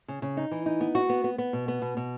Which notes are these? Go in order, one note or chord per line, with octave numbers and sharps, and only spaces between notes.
C#3
C#3
D#4
E3
D#4
B3
F#4
B3
B3
B3
B2
B3
B2
B2